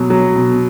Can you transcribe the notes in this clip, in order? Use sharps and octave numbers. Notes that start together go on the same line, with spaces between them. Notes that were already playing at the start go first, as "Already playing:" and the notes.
Already playing: B2 F#3
F#3
B2